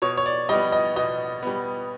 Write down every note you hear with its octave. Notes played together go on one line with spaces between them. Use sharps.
B2 C#5
C#5
D5
G3 B3 D#5
D#5
B2 D#5
G3 B3